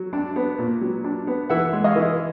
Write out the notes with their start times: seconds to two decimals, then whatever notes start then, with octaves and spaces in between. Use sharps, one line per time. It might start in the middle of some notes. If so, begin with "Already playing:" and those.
Already playing: F#3
0.13 D4
0.36 B3
0.58 A#2
0.81 F#3
1.04 D4
1.27 B3
1.50 E3 E5 F#5
1.73 G#3
1.84 D#5 F5
1.96 E3